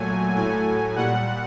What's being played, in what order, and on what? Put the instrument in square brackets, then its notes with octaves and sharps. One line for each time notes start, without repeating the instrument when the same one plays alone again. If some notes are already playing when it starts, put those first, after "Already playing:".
Already playing: [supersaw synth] A#2 F#3 A3 G#5
A2 F#3 A3 G#5
A#2 G3 F#5